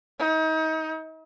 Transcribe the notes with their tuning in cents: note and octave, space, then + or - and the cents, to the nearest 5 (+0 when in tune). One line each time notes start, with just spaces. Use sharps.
D#4 +35